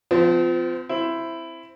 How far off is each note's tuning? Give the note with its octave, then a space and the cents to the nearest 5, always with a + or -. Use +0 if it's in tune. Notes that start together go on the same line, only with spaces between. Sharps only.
F3 +0 C4 -40
C4 +0 E4 +10